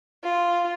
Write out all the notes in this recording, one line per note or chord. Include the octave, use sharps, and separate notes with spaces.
F4